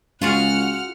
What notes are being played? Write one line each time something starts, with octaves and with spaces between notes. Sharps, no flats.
C#2 F4 F#4 G#4 F#5 F6